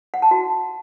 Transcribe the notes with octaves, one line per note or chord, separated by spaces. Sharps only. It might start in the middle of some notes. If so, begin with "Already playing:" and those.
F#5
A5
F#4